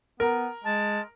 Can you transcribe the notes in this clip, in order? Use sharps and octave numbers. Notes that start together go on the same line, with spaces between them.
B3 A#4
G#3 A5